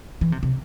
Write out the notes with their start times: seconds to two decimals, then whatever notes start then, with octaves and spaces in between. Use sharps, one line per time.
0.21 E3
0.32 C3
0.43 C3